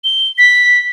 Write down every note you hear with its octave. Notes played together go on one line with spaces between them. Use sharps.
G7
B6